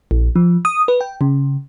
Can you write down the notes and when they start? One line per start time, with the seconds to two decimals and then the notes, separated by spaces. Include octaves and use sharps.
0.11 A#1
0.36 F3
0.65 D#6
0.88 B4
1.01 G5
1.21 C#3